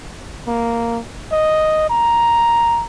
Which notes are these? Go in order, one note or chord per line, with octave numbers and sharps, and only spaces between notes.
A#3
D#5
A#5